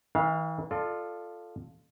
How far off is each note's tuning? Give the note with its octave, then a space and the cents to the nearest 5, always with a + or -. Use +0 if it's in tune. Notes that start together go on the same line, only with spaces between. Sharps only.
E3 -40 F5 +0
F4 +0 A4 +0 D5 +40